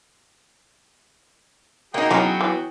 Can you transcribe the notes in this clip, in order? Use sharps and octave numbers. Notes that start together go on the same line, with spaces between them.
A#3 D#4 F#4 G#4 G5
E3 F#3 B3 C#4 D#4
E3